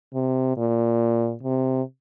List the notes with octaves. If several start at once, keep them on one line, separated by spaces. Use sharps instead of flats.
C3
A#2
C3